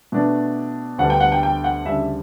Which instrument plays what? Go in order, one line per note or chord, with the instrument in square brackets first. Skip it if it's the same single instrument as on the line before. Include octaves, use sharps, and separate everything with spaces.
[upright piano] B2 A3 D4
D2 D3 G3 B3 D4 F#5
G5
F#5
G5
G5
F#5
D2 C#3 G3 D4 E5